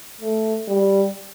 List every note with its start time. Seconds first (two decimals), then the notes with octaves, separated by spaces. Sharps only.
0.21 A3
0.68 G3